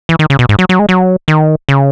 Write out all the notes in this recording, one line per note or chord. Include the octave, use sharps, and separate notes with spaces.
E3
D#3
C#3
B2
G#2
F#3
F#3
G#3
F#3
D#3
C#3